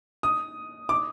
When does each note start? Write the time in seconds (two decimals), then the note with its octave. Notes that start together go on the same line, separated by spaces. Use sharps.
0.23 D#6
0.89 D6